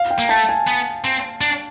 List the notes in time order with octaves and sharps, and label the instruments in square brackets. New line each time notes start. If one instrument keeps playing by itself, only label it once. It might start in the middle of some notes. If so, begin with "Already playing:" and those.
Already playing: [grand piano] F5
G5
[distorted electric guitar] A#3
[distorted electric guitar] A3 [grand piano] A5
[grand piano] G#5
[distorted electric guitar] B3
C4
D4